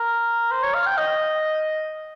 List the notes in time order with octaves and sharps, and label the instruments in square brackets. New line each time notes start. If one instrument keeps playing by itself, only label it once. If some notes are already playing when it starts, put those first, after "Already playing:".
Already playing: [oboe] A#4
C5
C#5
F5
G5
D#5